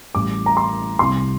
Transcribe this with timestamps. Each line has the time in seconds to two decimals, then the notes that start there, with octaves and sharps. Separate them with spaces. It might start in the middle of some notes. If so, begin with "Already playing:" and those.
0.15 A1 A2 G3 D6
0.46 A#5
0.57 C6
0.99 C2 C3 G3 C6